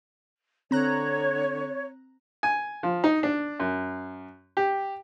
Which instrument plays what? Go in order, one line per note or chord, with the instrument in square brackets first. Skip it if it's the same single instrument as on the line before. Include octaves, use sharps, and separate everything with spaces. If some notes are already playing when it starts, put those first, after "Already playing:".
[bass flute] D3 [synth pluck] C4 A#5 F#6 [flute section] C#5
[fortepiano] G#5
F3
D#4
D4
F#2
G4